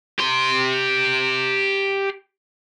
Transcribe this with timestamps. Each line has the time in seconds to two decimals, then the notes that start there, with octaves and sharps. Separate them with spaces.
0.19 G4 C6